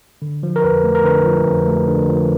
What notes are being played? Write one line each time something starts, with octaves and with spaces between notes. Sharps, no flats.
D3
F3
A#4
F2 B4
A3
A#4
D3 B4
F3
F2
A3
D3
F3